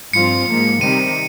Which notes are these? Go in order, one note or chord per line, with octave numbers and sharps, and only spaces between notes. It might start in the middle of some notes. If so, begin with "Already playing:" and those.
G2 F3 C4 F4 C#7
G#2 F3 A#3
C3 D#3 G3 D#7